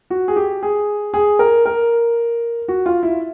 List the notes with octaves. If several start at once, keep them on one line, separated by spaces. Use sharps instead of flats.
F#4
G#4
G4
G#4
G#4
A#4
A#4
F#4
F4
E4